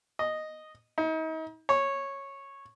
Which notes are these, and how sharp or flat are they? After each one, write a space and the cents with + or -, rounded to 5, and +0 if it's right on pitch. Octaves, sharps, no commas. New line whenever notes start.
D#5 -5
D#4 +40
C#5 -10